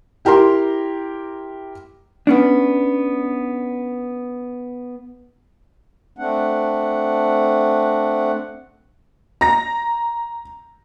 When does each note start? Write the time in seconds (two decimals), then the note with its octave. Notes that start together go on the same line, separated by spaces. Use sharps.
0.25 E4 G4 A#4 A#5 C6
2.27 B3 C#4 D4
6.18 A3 C4 D4 F#5
9.41 A#5 A#6